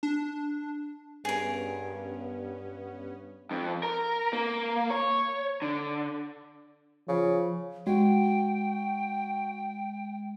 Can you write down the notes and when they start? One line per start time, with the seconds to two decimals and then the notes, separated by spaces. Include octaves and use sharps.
0.03 D4
1.25 G2 B3 C#4 G#4 A#4
3.51 F2
3.83 A#4
4.33 A#3
4.90 C#5
5.62 D3
7.08 C#3 F3
7.87 G#3 F#4 G5